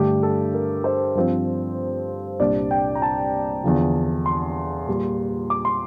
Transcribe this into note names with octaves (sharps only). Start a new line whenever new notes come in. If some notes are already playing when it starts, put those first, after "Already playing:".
Already playing: G2 D3 A3 D4 G4
A4
A#4
C5
G2 F3 C4
C2 A#2 G3 D4 D5
G5
A#5
A5
E2 D3 F3
C6
A#2 G3 A#3
D6
C6